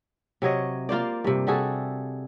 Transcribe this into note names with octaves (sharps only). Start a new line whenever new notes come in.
C3 F#3 C#5 D#5
A#3 F4 C5 D5
G2 C3
G3 F#4 G#4 A4